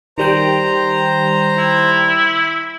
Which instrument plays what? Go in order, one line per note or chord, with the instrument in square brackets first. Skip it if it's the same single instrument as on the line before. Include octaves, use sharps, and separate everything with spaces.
[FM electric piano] D#3 G3 G5 [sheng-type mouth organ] C5 A#5
[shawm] E4